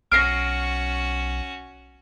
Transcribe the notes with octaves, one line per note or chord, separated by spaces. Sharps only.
B1 C#4 F#4 F6 A#6 C7 D7